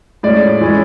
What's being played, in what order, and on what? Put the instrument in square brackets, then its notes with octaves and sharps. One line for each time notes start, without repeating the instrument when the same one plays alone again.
[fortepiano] A2 G#3 C#4 D5
E3 G#3 C#4